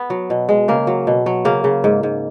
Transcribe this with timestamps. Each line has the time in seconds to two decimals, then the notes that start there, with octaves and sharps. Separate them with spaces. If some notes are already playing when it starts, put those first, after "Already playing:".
Already playing: B3
0.10 F#3
0.30 B2
0.49 G#3
0.68 C#3 A#3
0.87 F#3
1.07 B2
1.26 F#3
1.45 C#3 A#3
1.64 C#3
1.84 G#2
2.03 G#2